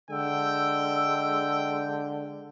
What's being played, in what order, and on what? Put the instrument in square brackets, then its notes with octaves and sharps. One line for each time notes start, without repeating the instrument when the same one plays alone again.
[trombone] D3 [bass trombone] G#3 [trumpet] G5 [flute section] E6